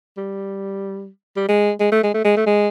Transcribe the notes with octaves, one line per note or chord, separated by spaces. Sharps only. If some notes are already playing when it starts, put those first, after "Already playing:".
G3
G3
G#3
G#3
A3
G#3
A3
G#3
A3
G#3